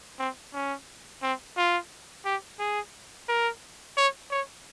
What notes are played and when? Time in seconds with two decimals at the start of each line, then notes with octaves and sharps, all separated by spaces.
0.19 C4
0.53 C#4
1.23 C4
1.57 F4
2.25 G4
2.59 G#4
3.28 A#4
3.97 C#5
4.31 C#5